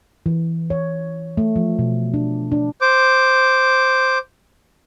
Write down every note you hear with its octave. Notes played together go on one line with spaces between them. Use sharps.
E3
C#5
A3
F3
B2
D4
D4
C5 D6